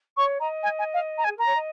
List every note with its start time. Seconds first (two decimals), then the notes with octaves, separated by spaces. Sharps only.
0.17 C#5 C#6
0.40 D#5 A#5
0.63 G#5
0.79 G#5
0.94 F5
1.18 A#5
1.24 G#5
1.27 G#4
1.36 A#4 A#5
1.46 C#5
1.55 D#5